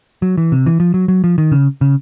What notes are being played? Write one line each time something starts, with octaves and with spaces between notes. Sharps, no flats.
F#3
E3
C3
E3
F3
F#3
F#3
F3
D#3
C#3
C#3